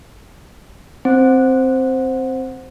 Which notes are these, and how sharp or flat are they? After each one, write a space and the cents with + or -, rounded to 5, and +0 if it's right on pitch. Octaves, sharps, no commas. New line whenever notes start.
C4 +0 C5 +0